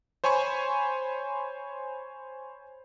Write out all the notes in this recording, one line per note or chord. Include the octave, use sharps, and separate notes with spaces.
C5 C#5 G#5 B5 C#6